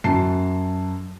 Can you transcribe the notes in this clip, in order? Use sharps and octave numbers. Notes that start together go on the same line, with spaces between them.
F#2 F#4 A5 C7